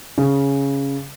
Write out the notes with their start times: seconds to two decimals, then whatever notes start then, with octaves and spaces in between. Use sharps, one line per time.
0.18 C#3